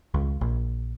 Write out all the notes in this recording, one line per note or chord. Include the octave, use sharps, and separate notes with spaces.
C#2
A#1